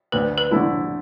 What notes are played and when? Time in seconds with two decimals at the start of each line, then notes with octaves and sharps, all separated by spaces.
0.12 D2 B4
0.38 B4
0.51 D3 A3 E4